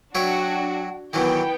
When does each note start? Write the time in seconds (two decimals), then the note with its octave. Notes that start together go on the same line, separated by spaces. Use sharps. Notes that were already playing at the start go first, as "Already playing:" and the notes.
0.15 F#3 D4 F#4 C#5 E5 G5
1.13 D#3 E3 F#3 B3 E4 G5